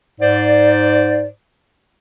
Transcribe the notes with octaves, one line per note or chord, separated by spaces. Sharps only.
G#2 C5 D5